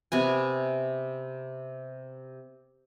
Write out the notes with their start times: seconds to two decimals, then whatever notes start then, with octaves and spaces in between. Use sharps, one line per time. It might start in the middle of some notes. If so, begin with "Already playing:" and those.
0.12 C3 B3 G#5